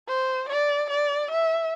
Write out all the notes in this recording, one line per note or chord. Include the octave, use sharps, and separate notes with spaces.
C5
D5
D5
E5